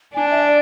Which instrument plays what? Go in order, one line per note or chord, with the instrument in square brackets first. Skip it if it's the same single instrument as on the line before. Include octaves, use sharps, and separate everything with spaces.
[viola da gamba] D4 [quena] G#5
[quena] E5
D5